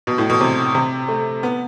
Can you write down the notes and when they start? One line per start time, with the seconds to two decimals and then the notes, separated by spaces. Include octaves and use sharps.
0.07 B2
0.18 A2
0.30 B2
0.41 C3
0.75 C3
1.08 A3
1.43 B3